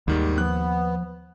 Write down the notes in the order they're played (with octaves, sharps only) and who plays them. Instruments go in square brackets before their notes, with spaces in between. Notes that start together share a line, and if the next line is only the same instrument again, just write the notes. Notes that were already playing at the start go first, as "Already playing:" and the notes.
[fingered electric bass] D#2 [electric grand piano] G#2 D#3 G3
[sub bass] F3 [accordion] B3 [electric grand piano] F#6